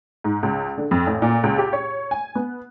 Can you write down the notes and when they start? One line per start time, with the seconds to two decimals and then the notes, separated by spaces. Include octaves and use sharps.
0.24 G#2
0.43 C#2
0.78 D3
0.91 F2
1.07 A1
1.22 A#2
1.43 C#2
1.58 G4
1.73 C#5
2.11 G#5
2.35 B3